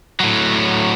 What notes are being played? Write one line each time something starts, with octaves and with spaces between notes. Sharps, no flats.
A2 F#3